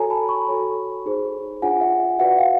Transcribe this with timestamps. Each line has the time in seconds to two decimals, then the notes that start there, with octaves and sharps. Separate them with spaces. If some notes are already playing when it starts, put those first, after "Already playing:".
Already playing: F#4 A4 C#5 G#5 A#5
0.10 A5 B5
0.29 B5 C#6
0.48 F#4 A4 C#5
1.06 D#4 G#4 C5
1.62 D4 F4 G#4 C#5 F#5 G#5
1.81 E5 F#5
2.19 F#4 B4 D5 E5 F#5
2.38 F5 G5